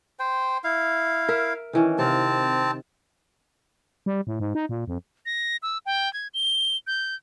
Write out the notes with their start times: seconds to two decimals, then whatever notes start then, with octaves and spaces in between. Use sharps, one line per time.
0.19 C5 G5
0.64 E4 F5
1.29 A#4 E5
1.73 D#3 E3 C#4
1.99 C3 C4 F5 A5
4.06 G3
4.27 A2
4.40 G#2
4.55 D#4
4.69 A#2
4.88 F2
5.26 A#6
5.63 E6
5.86 G5
6.13 G#6
6.34 G7
6.87 G6